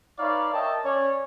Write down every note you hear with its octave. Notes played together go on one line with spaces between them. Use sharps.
D#4 B4 C#5 D5 F5
A#4 C#5 D#5 E5 G5 A5
C#4 C#5 D5